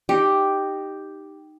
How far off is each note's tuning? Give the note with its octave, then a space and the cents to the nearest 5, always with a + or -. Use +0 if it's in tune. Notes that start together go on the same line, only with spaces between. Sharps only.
D#4 -10 G4 +0